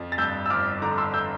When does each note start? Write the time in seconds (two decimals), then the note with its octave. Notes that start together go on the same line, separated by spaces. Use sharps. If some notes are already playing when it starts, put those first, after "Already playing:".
Already playing: F2 F3
0.12 A6
0.18 G2 E6 G6
0.46 E6
0.50 G1 D6 F6
0.82 D3 A#5 D6
0.98 C6 E6
1.14 E6 G6